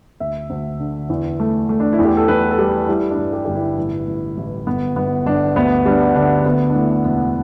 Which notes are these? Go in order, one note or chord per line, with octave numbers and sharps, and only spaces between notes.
D2 E5
D2
D3
E2
A3
A3
D4
E4
E2
G4
A4
E2 B4
A4
G3 G4
G3 E4
D4
G2
G4
G1 G4
E4
A1
A1
A1
G1 B3
G1 B3
G1 D4
D2 B3
G3 D4
D3 D4
D2 B3
D4
A3 E4
E1 B3